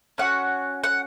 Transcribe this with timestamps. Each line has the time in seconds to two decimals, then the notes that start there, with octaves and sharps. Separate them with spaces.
0.18 C#4 F#4 F#5
0.84 F#5